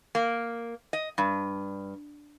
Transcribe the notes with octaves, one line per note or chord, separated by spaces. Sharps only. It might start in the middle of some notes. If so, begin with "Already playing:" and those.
A#3
D#5
G2